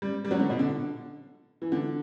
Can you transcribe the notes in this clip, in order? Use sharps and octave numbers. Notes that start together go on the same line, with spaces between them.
G3
G3
F#3
D3
B2
D3
E3
D3